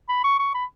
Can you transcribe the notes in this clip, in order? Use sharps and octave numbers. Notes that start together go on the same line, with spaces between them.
B5
C#6
C#6
B5